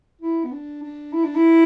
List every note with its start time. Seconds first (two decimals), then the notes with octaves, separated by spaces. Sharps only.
0.21 E4
0.44 B3
0.52 D4
0.83 D4
1.13 E4
1.24 D4
1.36 E4